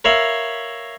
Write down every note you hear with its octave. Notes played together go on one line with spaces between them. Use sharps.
A#4 C#5 E5 F5 B5